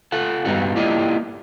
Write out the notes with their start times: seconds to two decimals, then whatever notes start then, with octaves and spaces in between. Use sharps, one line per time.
0.12 F4 A4 F#5
0.45 G2 G3 B3 D#4 F#4
0.75 A#3 E4 F4 G4 D5 D#5